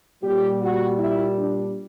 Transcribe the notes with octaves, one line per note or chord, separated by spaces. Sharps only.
A#2 G3 G4
F#4
E4
D4